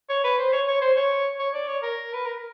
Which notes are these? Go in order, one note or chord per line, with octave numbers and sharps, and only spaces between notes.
C#5
B4
C5
C#5
C#5
C5
C#5
C#5
D5
C#5
A#4
B4
A#4